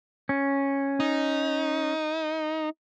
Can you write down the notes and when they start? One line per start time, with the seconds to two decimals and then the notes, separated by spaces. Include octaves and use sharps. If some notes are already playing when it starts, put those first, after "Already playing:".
0.29 C#4
1.00 D#4